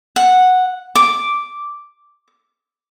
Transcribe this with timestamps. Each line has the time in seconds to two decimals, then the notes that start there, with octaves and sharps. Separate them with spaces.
0.16 F#5
0.95 D6